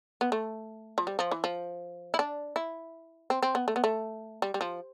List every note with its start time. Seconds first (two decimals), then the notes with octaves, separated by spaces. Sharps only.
0.21 B3
0.32 A3
0.98 F3
1.07 G3
1.19 F3
1.32 E3
1.44 F3
2.14 E4
2.19 D4
2.56 E4
3.30 C4
3.42 C4
3.55 B3
3.68 A3
3.76 B3
3.84 A3
4.42 G3
4.54 G3
4.61 F3